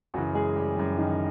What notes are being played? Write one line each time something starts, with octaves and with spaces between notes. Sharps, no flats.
F#2 C#3 E3 F#3 F#4
G#3 G#4
G3 G4
F#2 C#3 E3
D#3 D#4